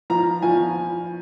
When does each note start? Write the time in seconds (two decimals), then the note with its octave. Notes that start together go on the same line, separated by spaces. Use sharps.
0.10 F3 A#5
0.42 F3 G#5